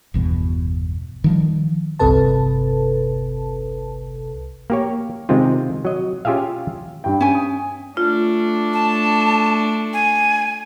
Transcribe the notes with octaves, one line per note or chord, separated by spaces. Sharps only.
G1 E2 B2
D#3 F3 G3
G1 C2 C3 A4 B4 A5
A#3 G4 C#5
C3 D#3 G#3 C4 F4
F#3 D#5
C#4 F4 G4 G#4 E5 F5
G2 G5
C#4 G#5
D#6
A3 D4 F4
A5
G#5